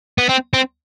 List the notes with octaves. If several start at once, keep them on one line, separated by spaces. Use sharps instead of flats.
B3
C4
C4